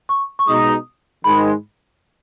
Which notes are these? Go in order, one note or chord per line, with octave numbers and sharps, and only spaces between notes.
C#6
C#6
B2 G#3 D#4 D#6
G#2 D#3 G#3 B5